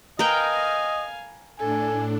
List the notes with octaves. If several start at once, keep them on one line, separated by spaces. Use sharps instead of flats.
A#4 B4 D#5 F5 G5 G#5
A2 D4 A4 G#5